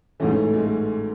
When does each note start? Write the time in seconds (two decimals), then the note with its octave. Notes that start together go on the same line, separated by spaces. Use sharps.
0.20 A1 G#2 E3 A3 C#4
0.31 A3 C#4
0.42 A3
0.54 G#3
0.65 A3